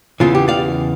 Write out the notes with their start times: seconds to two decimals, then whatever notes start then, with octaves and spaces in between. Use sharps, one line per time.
0.20 E2 C#3 E3 F4
0.35 G4
0.48 D5 F5